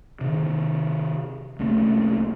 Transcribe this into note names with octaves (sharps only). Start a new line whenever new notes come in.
C3 D#3
C2 A3 A#3 C#4